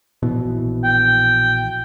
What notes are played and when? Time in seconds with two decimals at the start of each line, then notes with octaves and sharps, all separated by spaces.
0.23 A#1 B2 E3
0.84 G5